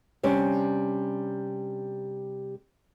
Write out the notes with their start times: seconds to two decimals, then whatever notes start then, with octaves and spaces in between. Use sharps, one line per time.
0.23 C3 G3 C#4 D4